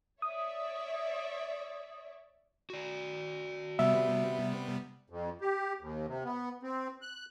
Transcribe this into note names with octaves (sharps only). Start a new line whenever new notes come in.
C#5 D5 E5 D#6
F#4 D5
C3 G3 B3 E5
F2
G4
D#2
C3
B3
C4
F#6